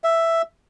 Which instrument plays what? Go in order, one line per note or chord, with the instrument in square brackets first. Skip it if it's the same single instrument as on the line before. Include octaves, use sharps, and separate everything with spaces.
[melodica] E5